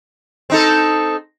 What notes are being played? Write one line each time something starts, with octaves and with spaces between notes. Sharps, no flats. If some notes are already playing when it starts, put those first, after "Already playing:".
C4 D#4 A4